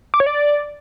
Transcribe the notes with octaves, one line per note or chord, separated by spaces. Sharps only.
D6
C#5
D5